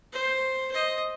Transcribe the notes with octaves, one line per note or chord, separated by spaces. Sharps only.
C5
C5 D#5